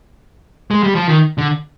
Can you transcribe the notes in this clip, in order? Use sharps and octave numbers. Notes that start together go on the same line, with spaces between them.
G#3
G3
F3
D#3
D3